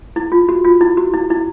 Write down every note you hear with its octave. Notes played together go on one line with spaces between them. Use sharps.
E4
F4
F#4
F4
E4
F#4
E4
E4